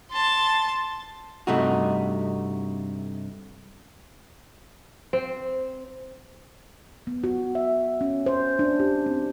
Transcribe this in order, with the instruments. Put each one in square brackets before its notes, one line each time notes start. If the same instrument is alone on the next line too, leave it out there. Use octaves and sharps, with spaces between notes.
[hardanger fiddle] A5 C6
[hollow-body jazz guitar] G2 C3 A3 D#4 F#4
[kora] C4
[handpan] B3
F#4
E5
C#4
C5
D4
G4
C4